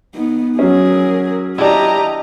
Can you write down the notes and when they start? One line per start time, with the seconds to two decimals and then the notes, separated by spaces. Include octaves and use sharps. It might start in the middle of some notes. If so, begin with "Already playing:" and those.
0.14 B3 D#4
0.59 F#3 C#4 G#4 A#4
1.58 D4 E4 G4 D#5 A#5